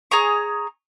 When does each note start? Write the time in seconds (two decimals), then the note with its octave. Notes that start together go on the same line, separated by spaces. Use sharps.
0.11 G#4 C#5 A#5 C#6